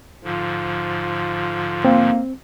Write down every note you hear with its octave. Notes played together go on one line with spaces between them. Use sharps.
G#2 D3 F3 F4
A#3 C4